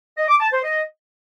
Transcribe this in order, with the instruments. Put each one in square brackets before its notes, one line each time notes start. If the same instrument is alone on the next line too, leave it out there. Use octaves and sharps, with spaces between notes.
[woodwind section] D#5
D6
A5
C5
D#5